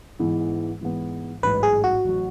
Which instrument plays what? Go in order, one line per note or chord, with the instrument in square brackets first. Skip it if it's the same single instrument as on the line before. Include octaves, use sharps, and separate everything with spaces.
[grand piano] G#2 E3 G#3 B3 E4
G#2 E3 G#3 B3 E4
[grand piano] A1 G#2 F#3 [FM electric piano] B4
[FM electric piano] G#4
F#4
[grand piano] A1 F#3